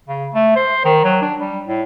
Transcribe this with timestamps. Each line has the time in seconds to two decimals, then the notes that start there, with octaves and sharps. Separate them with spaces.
0.08 C#3
0.34 A3
0.56 C5
0.85 D#3
1.04 F#3
1.21 D4
1.40 G3
1.67 A2